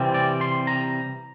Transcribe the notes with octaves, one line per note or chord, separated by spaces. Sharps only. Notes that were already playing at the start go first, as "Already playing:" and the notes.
Already playing: C3 E3 G3 C4
D5
C6
A#5